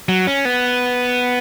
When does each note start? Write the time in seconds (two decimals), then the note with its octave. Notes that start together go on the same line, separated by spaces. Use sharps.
0.09 F#3
0.27 C#4
0.45 B3